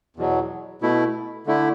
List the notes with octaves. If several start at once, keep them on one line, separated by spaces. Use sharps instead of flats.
E2 B2 F#3
B2 A3 E4
D3 A3 E4